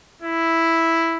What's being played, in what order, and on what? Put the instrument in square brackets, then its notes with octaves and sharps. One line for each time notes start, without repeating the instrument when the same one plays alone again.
[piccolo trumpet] E4